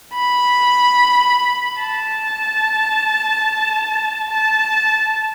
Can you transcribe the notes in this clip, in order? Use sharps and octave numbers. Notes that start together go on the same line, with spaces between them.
B5
A5
A5